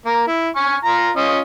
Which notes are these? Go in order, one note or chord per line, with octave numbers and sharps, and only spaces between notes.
A#3 A#4
E4
G#5 C#6 F6
F4 A#5
C#4 F4 D#5